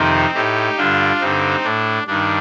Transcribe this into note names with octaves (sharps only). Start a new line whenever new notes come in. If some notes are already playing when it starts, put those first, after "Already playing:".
Already playing: F2 C3 D#3 C4 D#4
A2 D#4 G4
G2 D3 D4 F4
G2 D3 C4 D#4
A2 D4
G2 D#3 D4